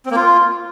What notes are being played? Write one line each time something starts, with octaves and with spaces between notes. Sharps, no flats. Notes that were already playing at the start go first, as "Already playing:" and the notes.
C4
A#3
F4